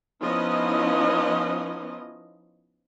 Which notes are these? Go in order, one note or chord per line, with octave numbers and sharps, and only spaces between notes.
F3 B3 C#4 D#4 E4 D#5